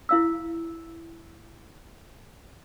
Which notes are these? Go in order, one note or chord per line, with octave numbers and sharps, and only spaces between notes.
E4 F5 E6